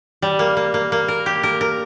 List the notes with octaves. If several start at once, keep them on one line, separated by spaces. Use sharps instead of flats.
G3
A#3
A#3
A#3
A#3
A#4
G4
A#4
A#4